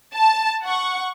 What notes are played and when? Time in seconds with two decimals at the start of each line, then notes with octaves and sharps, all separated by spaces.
0.14 A5
0.63 F#5 C#6